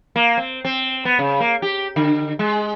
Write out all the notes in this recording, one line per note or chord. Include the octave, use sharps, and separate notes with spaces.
A#3
C4
C4
B3
C#3
A#3
G4
D3
G#3